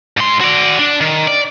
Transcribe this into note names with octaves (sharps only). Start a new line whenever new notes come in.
G#2 C6
F#4 D5
D4
D#3
D5